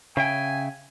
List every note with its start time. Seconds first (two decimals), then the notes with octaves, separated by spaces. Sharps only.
0.17 C#3 E5 G5 G#5